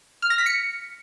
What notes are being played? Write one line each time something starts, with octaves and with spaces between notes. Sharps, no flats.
F6
A#6
B6
C#7